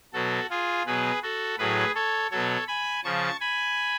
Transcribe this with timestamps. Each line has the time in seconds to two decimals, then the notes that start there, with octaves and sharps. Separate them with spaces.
0.13 B2 F#3 F#4 A4
0.50 F4 G#4
0.86 B2 F#3 G#4 B4
1.22 F#4 A4
1.58 A2 F#3 G#4 B4
1.95 A4 C#5
2.31 B2 F#3 A4 C#5
2.67 G#5 B5
3.04 C#3 F3 A5 C#6
3.40 G#5 B5